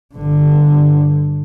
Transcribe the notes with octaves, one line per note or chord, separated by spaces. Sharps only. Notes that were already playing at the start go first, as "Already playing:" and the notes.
G1 D3